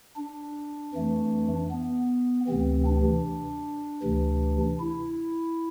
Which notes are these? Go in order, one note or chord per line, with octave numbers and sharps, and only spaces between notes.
D4
F2 E3 A3
B3
D2 C3 E3 C4
D4
D2 C3 E3
E4